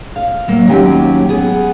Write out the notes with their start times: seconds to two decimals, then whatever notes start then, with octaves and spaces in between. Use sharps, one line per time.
0.16 F5
0.48 F#3 A#3
0.68 D#2 F#3 C#4 G4 F#5 G5
1.29 B3 G#4